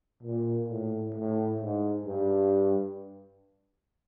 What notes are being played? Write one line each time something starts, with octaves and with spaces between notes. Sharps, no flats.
A#2
A2
A2
G#2
G2